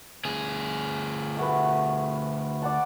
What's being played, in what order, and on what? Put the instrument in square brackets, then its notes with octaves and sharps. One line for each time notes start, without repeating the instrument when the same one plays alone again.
[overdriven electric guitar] D2 G#4
[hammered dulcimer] A3 F#4 B4
D5 F#5 A5